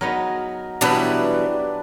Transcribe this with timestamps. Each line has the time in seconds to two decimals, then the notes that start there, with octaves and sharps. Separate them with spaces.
0.01 F#3 B3 D#4 A#4
0.81 B2 E3 F#3 G3 D4 G4 B4 B5